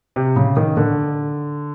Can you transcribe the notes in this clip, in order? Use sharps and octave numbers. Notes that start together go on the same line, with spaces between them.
C3
C#3
D#3
D3